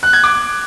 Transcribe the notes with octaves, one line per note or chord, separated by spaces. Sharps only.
F#6
G#6
D6